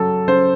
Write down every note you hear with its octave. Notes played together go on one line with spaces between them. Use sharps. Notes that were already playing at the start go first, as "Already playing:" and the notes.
Already playing: C#3 F#3 A4
C#3 C5